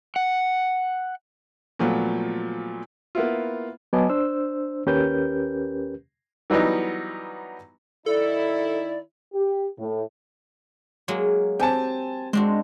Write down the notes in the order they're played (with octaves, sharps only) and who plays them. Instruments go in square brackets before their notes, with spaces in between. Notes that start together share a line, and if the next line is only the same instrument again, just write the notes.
[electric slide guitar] F#5
[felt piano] A#2 F3 F#3 A3 B3
[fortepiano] A#3 B3 E4 F4
[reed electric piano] F#3 B3 D#5 G#5 A5 D6
D4 C5 E6
D#2 C#4 G4 A#4 B4 G6
[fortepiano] E3 F#3 G3 B3 D#4
[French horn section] D#3 D#4 E4 [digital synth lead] A4 [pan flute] D5
[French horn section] G4
A2
[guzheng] F#3 G#3 A#3
[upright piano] C4 G#5 A5 [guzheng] G4
[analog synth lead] G#3 [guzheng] C4 D4 F#4